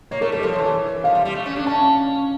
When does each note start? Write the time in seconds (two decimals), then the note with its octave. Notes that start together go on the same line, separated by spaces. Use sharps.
0.11 A#3 C#5
0.21 A3 A#4
0.32 G3 A4
0.43 F3 A4
0.58 E3
1.04 F3 F5
1.15 G3
1.25 G3
1.35 A3
1.46 C#4
1.56 D4
1.66 C#4 A5